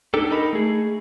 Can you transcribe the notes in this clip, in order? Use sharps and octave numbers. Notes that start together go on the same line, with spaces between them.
D4 D#4 G4 A4
D#4 A4 A#4 D#5 B5
A3 G#4